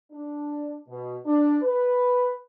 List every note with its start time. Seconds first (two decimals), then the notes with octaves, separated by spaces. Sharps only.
0.12 D4
0.89 B2
1.26 D4
1.62 B4